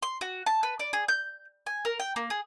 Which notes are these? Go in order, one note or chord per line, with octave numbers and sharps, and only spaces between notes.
C6
F#4
A5
B4
D5
G#4
G6
G#5
A#4
G5
A#3
G#4